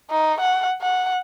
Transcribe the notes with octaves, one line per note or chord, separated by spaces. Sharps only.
D#4
F#5
F#5